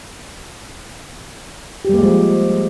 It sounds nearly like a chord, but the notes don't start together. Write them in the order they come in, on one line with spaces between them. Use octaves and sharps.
G4 G3 A#3 G#3 F3